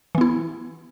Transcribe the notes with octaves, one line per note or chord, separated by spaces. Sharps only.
E3 B3 E4